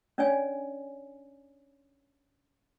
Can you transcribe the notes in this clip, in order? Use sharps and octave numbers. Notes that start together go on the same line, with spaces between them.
C#4 D4 C#5 D5 G#5